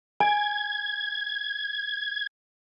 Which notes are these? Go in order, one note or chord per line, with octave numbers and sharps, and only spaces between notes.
G#5 G#6